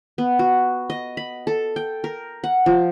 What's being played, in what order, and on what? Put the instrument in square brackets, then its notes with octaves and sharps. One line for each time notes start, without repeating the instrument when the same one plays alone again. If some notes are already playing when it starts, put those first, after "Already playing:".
[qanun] B3
F#4
D#5
B5
A4
G5
A#4
F#5
F3